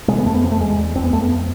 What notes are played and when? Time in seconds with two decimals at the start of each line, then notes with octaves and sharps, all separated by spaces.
0.08 C3 G#3
0.19 B3
0.25 F2 A3
0.35 B3
0.43 F2 C4
0.52 A3
0.60 E2 G#3
0.78 E2
0.95 F2 C4
1.04 B3
1.13 F2 A3
1.21 B3